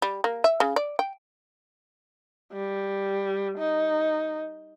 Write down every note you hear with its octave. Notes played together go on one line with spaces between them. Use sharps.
G3
A#3
E5
C#3
D5
G5
G3
D#4